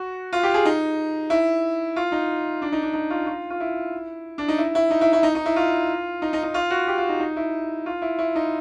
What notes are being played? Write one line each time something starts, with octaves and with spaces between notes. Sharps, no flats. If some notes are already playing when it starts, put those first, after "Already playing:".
Already playing: F#4
F4
G4
G#4
D#4
E4
F4
D#4
D4
D#4
D4
D#4
F4
F4
F4
E4
D4
D#4
E4
E4
D#4
E4
E4
D#4
D#4
E4
F4
D#4
D#4
D#4
F4
F#4
G4
F4
D#4
D#4
E4
F4
E4
E4
D#4